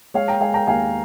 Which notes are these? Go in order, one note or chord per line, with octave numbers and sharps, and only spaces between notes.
G#3 C#5 F5
G5 A#5
G#3 F5 G#5
G5 A#5
D#2 F5 G#5